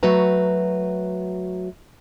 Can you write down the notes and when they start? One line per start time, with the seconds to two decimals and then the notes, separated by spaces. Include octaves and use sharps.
0.03 F#3 A3 F#4 B4 A#5